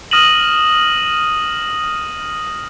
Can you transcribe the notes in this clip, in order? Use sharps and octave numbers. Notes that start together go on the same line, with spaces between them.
D#6 F6 A#6 D#7 E7 F#7